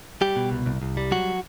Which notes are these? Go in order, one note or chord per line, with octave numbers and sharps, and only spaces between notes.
G3 G4
B2
C2
C2
C2
G3
F#3 F#4